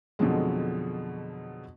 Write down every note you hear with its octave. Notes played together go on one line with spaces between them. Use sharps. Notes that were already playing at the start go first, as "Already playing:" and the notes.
F2 B2 D3 F3 F#3 G#3